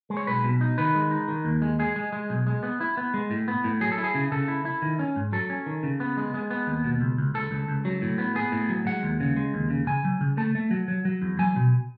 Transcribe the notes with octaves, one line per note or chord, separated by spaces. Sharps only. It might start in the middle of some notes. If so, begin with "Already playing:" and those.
G#3
C#5
B1 B4
B2
D#4
D#3 B4
G#3
D#4
D#3
D#2
G#3
G#3 G#4
G#3
G#3
B1
G#3
B3
E4
B3
G#3
A2
B3
A2
F#3 G#4
A4
E4
G#4
C#3
C#3 A4
E4
E4
D#3
C#4
G#2
F#3 A4
C#4
D#3
C#3
B3
G#3
G#3
B3
D#2
B2
C#2
C#2
C#2 A4
C#2
C#2
F#3
A2
B3
B3 G#4
A2
F#3
G#3 F#5
D#2
C#3
G#3
D#2
C#3
C#3 G#5
F#3
C#3
A3 A5
A3
F#3
F#3
F#3
E2
F#3 G#5
B2